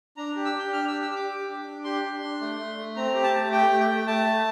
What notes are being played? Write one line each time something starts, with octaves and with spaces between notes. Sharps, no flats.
D4 A#5
G4
E6
G4 G6
D4 F6
G4 E6
E6
G4
D6
G4
D4
D4
G4 C6
D4
D4
A3
A3
A3
C4 A#5
G4
A5
A3
G4 G5
A3
G5
A3
A3 A5
A3